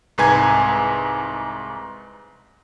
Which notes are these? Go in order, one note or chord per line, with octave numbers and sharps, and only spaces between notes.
C2 G#2 B4 G#5 A#5 G#6